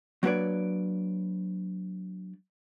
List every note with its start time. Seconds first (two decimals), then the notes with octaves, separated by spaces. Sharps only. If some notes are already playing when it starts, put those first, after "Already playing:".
0.23 F#3 A#3 D4 B4 C#5 D5